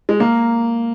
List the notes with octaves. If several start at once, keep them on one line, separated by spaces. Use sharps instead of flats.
G#3
A#3